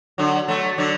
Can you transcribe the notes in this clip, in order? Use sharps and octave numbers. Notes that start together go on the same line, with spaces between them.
D3 F#3
F#3 A3
D3 F#3